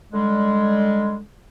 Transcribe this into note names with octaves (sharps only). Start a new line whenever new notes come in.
D3 G3 G#3